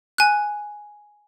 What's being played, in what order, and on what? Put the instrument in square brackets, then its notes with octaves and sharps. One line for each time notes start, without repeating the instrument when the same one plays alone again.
[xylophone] G#5 F#6